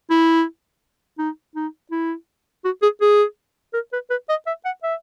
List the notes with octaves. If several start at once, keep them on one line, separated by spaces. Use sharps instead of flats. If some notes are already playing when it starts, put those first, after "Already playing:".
E4
D#4
D#4
E4
F#4
G#4
G#4
A#4
B4
B4
D#5
E5
F#5
E5